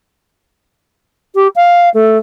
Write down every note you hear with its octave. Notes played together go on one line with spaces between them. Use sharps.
G4
F5
A3